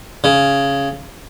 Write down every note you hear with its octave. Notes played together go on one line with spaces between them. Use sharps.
C#3